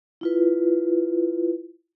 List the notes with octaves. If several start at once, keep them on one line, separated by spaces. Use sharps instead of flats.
E4 F4 B4